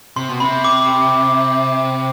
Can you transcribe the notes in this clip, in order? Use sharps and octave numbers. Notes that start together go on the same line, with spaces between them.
C3 C6
B2
C3 B5
D6